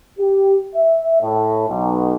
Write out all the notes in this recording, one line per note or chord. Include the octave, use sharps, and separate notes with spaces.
G4
E5
A2
B1